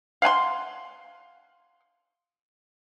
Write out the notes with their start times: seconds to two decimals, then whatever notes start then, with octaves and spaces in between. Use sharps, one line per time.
0.22 F5 F#5 G#5 C6